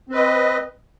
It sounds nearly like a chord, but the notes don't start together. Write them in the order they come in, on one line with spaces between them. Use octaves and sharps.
C4 B4 D#5